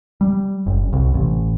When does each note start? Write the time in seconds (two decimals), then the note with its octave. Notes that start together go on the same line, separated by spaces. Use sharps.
0.21 G3
0.66 F#1
0.93 C2
1.14 A1